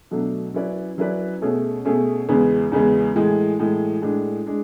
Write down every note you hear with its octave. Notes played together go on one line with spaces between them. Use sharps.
B2 F#3 A3 D4
F#3 C#4 E4 B4 D5
F#3 C#4 E4 B4 D5
B2 A3 C#4 G#4
B2 A3 C#4 G#4
E2 C#3 G#3 B3
E2 C#3 G#3 B3
A2 E3 G#3
A2 E3 G#3
A2 G#3 D4
G#3 D4